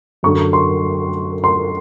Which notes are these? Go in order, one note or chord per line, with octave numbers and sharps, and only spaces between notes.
F#2 D3 F#3 C#6
C6
C6